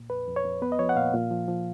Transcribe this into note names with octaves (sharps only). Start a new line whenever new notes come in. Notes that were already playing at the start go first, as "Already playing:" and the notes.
Already playing: A#2
F2 B4
F2
C#5
F2
B3 B4
D#5
F3 C#5
F#5
A#2 F5
A#2
F3
F3